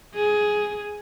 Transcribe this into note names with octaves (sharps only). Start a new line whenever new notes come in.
G#4